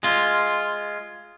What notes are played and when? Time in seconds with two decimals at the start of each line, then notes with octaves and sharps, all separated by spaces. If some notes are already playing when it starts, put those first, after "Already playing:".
0.03 G#3 F4